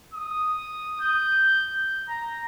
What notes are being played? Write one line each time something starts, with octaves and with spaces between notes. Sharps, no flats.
D#6
G6
A#5